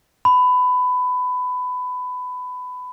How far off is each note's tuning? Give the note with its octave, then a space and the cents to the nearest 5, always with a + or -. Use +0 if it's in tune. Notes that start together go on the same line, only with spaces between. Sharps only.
B5 +20